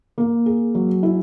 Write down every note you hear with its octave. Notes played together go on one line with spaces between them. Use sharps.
A#3
G#4
F#3
E4